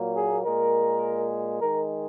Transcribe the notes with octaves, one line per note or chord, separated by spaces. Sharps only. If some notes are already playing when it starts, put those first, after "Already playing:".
Already playing: A#2 F#3 A#3
G#4
A#2 G#3 A#4
D#3 G#3 A#4